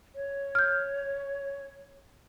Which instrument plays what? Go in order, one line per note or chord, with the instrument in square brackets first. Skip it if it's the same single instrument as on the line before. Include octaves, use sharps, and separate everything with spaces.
[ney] C#5
[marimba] F6 G6